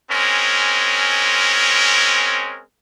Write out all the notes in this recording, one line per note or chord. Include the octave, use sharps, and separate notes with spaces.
G#3 C4 C#4 A#4